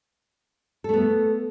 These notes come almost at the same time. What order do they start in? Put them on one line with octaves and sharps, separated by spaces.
A4 A3 B3